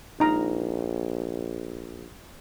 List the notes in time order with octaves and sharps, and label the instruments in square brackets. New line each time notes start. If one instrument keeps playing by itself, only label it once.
[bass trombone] A#1 [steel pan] D#4 A#5